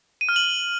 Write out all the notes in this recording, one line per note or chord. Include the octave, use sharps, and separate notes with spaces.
D#7
F6
F#7